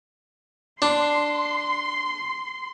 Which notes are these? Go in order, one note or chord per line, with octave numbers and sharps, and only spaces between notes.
D4 C6